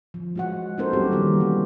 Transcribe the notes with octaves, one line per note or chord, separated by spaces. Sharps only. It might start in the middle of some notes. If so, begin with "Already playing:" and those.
F3
G#3 F#4 F#5
A#3 C#4 D#4 A4 A#4 C5
F#3 G3 C4 E4 F#4 G4
D#3 F3 G3 A#3 B3 C#4
E3 A#3